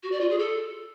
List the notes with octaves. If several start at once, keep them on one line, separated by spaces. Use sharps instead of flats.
F#4
D5
F4
G#4
A4